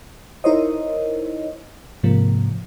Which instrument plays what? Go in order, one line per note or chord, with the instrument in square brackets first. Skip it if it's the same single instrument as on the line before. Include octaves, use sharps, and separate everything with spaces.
[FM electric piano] D#4 E4 A#4 C5 C#5 D#5
G#2 C3 F3 A#3